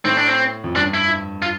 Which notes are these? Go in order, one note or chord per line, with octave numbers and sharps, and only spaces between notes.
A2 C4
D4
C4
F2
G2 D4
E4
F4